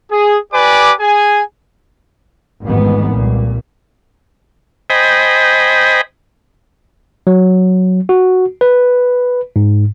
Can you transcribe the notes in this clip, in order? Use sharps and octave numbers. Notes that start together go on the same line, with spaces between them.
G#4
G4 B4 D5 G#5 D6
G#4 G#5
A1 F2 G#2 D#3 G#3 B3
C2 A#2
C5 D#5 G5 G#5 B5
F#3
F#4
B4
G#2